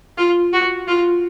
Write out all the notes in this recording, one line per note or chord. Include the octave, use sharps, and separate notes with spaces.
F4
F#4
F4